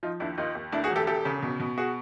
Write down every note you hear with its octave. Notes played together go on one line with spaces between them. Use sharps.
F3 D#4 F4
D#2 D4 E4
D#2 D#4 F4
D#2
D2 D4 E4
F#4 G#4
E1
G4 A4
E1 G4 A4
C#3
B2
B2
F#4 G#4